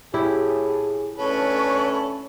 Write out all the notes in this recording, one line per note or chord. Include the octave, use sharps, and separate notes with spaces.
A2 E4 G4 G#4
D3 A3 C#4 A4 B4 C#5